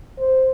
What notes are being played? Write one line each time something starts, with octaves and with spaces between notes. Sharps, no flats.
C5